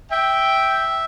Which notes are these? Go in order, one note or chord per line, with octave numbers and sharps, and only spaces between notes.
E5 G5